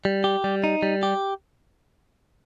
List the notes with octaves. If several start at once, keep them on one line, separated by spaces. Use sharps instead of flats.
G3
G4
G3
D#4
G3
G4